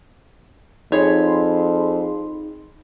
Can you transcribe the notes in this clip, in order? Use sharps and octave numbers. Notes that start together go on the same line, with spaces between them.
F2 D#4 G#4 C#5 B5 C6